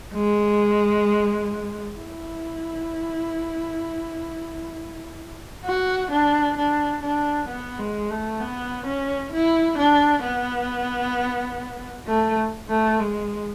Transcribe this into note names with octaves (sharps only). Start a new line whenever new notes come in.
G#3
E4
F#4
D4
D4
D4
B3
G#3
A3
B3
C#4
E4
D4
B3
A3
A3
G#3